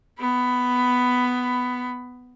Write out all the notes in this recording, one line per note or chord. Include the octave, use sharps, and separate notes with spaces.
B3 B5